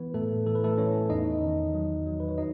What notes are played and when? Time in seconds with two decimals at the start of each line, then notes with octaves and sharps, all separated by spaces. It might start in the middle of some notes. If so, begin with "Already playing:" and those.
Already playing: E3 B3 B4
0.14 A2 A3 A4
0.46 E3 A4
0.55 B4
0.64 A3 A4
0.78 E3 C#4 C#5
1.10 E2 D#4 D#5
1.42 D#3
1.74 F#3
2.06 F#3
2.20 B4
2.29 C#5
2.38 F#3 D#4 D#5